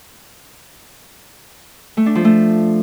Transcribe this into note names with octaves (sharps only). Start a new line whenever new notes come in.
A3
D4
F3
A3